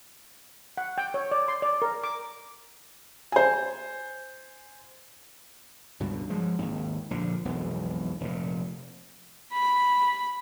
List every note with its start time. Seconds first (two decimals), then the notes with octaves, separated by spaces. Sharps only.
0.77 F#5
0.98 G5
1.14 C#5
1.31 D5
1.48 C6
1.62 D5
1.82 A#4
2.04 D6
3.32 C5 G#5
6.00 C#2 G2 B2
6.30 F3 G#3
6.59 G#1 D#2
7.11 A#1 D3 F3
7.45 E1 B1 F2
8.21 F1 A#2
9.53 B5